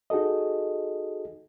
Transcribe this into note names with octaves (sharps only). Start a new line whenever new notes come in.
D#4 F#4 G#4 A4 D#5